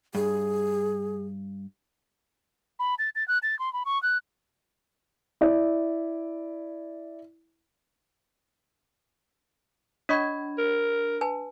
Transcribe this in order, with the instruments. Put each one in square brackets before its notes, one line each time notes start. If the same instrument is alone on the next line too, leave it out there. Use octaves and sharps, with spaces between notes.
[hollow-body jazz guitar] G2 [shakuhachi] G#4
[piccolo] B5
A6
A6
F#6
A6
C6
B5
C#6
F#6
[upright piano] E4 D5
[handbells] D4 B5 G#6 [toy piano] C#5 D#5 C#6
[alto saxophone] A#4
[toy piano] B4 G#5 A5